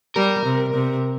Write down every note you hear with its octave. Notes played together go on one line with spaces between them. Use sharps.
G3 A#4
C3
C3